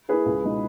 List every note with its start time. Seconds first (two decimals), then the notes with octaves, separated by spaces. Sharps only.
0.08 A#3 E4 G#4 B4
0.26 C#2
0.44 B2 G#3 D#4